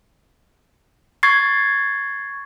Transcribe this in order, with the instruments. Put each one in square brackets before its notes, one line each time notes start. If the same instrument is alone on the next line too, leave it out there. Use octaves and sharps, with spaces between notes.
[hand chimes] C#6 G#6 A6 C7